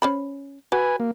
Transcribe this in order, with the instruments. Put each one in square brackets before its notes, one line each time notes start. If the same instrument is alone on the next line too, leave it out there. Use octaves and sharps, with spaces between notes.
[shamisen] C#4 C5 B5
[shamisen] F#4 [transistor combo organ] B4 G#5
[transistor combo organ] A#3